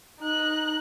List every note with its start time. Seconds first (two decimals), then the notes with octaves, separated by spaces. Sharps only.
0.21 D#4 F#6